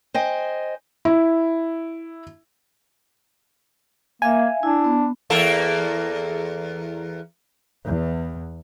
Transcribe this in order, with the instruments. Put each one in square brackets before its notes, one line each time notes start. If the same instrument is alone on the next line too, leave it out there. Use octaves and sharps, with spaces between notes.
[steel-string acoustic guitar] C5 D#5 G5 G#5
[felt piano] E4
[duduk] A#3 [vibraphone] E5 F5 [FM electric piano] G#5
[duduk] D4 [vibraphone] E4
[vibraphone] B3
[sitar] E2 A#3 A4
[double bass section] E2